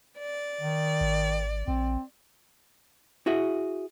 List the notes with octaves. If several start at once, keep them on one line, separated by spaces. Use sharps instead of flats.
D5
D#3
G#1
A#1 C4
E4 F#4 G#4 E5